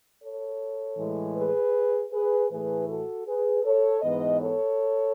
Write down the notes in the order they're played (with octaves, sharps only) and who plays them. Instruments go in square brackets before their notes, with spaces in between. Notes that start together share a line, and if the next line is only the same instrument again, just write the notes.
[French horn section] A4 C#5
A2 E3 G#3
G#4 B4
G#4 B4
A2 E3 A3 G#4 B4
F#4 A4
G#4 B4
A4 C#5
G#2 E3 B3 B4 D#5
A4 C#5